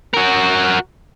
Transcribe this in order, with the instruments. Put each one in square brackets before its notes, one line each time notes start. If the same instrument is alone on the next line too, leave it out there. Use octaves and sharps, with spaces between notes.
[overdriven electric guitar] F#4 A#4